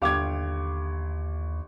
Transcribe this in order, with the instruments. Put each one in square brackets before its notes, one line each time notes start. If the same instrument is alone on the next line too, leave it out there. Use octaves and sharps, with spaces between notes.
[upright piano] G1 D6 G#6 [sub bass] D#2 [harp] G4 F5